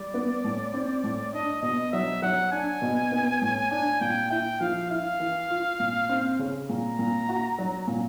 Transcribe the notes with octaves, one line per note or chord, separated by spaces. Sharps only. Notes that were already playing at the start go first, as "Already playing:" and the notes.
Already playing: G3 D5
B3
A2
C4
A2
D4 D#5
B2 D#5
F#3 E5
F#3 F#5
D4 G#5
B2
B3
A2
D4 G#5
A#2 G5
E4 G5
F3 F5
E4 F5
E3
F4
A#2
C4
C#3
A#2 A#5
A#2
F#4
F#3
A#2